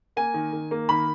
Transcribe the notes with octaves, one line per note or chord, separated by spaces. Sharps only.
A#3 G#5
D#3
D#3
A#3
D#3 B5